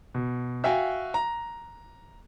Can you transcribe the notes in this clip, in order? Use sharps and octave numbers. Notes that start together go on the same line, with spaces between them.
B2
F#4 E5 F5 G5 G#5
A#5